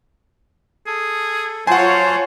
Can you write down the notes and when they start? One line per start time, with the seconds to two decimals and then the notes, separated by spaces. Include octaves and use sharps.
0.87 G#4 A4
1.67 F#3 F4 C5 C#5 F#5 G#5 A5 C6